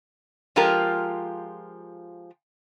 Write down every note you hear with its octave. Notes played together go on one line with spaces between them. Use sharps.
F3 G#3 F4 G4 A#4